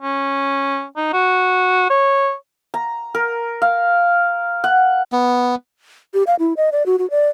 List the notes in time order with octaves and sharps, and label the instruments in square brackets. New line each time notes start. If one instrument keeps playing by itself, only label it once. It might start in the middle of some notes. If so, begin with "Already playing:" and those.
[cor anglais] C#4
D#4
F#4
C#5
[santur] A#5
A#4
F5
F#5
[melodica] B3
[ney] G4
F5
E4
D#5
D5
F#4
F#4
D5